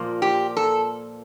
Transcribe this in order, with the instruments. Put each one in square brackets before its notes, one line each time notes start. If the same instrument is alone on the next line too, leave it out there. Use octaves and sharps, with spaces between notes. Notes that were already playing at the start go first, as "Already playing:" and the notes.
Already playing: [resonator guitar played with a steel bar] A#2 F3 A#3
G4
A4